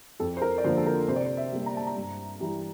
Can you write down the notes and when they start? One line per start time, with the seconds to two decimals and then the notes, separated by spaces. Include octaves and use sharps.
0.20 F2 A4
0.37 C5
0.42 A#4
0.58 D5
0.64 D3 F3 A#3 C5
0.77 A4
0.86 A#4
1.08 C3 C5
1.16 D5
1.24 C5
1.37 E5
1.52 G3 A#3
1.66 A#5
1.77 A5
1.87 A#5
1.96 G2
2.40 E3 G3